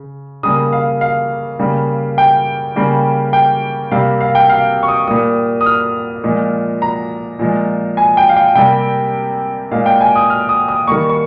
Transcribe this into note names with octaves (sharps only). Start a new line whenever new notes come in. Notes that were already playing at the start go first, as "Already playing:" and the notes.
Already playing: C#3
C#3 G3 A#3 D#6
F5
F5
C#3 G3 A#3
G5
C#3 G3 A#3
G5
C3 G3 A#3 F5
F5
G5
F5
C#6
D#6
A#2 G3 A#3 D#6
D#6
F6
A#2 F3 G#3
A#5
A#2 F3 G#3
G#5
G5
F5
G5
C3 G3 A#3 G5
A#2 G#3 F5
G5
G#5
D#6
F6
D#6
D#6
D#3 G3 A#3 C#6
C#6